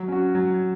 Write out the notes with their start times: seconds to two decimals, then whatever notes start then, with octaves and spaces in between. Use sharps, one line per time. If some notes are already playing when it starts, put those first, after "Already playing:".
Already playing: F#3
0.08 C#4 F#4
0.35 F#3